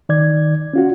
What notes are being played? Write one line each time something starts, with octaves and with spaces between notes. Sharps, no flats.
D#3 D5 G#6
C#4 F4 F#4